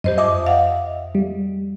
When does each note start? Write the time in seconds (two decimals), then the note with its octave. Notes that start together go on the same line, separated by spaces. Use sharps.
0.04 F#2 G4 C5 D#5
0.18 F2 D#5 E5 D6
0.46 F5 F#5
1.15 G3